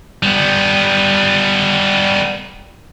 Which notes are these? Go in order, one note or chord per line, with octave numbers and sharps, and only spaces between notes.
G3 B3